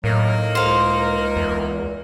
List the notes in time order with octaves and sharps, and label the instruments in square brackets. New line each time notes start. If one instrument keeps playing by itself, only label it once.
[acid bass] A2 [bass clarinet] F#3 [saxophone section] A#3 D#4 A#4
[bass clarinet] C#2 [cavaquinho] C5 F5
[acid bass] E2